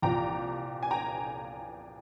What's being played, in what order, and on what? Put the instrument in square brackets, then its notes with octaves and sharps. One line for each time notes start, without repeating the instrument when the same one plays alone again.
[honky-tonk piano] C2 A#2 F3 G5 A#5
G#5
G5 A#5